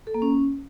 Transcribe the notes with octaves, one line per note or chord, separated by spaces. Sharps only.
A4
A#3
C#4